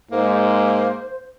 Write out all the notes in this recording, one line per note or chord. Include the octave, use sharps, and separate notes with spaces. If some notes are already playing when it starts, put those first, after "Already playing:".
G#2 A#3 C5